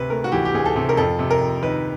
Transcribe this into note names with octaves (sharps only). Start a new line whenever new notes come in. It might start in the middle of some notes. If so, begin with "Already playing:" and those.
Already playing: D2 C3 B4
A3 A#4
F#4
E3 G4
G4
D2 G#4
A4
C3
A#4
F2 A4
C3
A#4
F2
D#3 B4